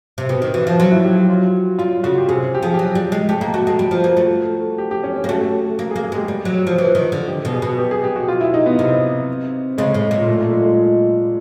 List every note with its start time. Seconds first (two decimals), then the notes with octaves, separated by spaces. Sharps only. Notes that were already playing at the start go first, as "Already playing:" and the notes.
0.18 C3
0.29 B2 G4
0.42 D#3
0.54 E3 F#4
0.67 F3
0.79 F#3 F4
0.92 E4
1.04 G4
1.16 G4
1.29 F4
1.79 G3 F4
2.03 C#3 F#4
2.18 G4
2.28 C3 G#4
2.55 G4
2.63 F3 G#4
2.74 G4
2.79 F#3
2.95 G3
3.12 G#3
3.29 A3 G4
3.41 A#3
3.54 A3 F#4
3.67 G#3
3.79 G3
3.91 F3
4.04 A#3
4.17 A3
4.78 G4
4.91 G4
5.04 C#4
5.16 C#4
5.24 A#3
5.28 A3 F#4
5.79 A#3
5.91 G#4
5.96 A#3
6.04 G#4
6.12 G#3 G4
6.28 G3
6.45 F#3
6.67 F3
6.78 E3
6.95 D#3
7.12 D3
7.28 G4
7.45 B2
7.53 G#4
7.62 B2
7.78 G4
7.91 G#4
8.04 G4
8.16 F#4
8.28 F4
8.41 E4
8.54 D#4
8.66 B3
8.79 C3
9.78 C#3 G#3
9.94 A2
10.11 A#2
10.28 A3
10.41 A3
10.53 G#3
10.65 G#3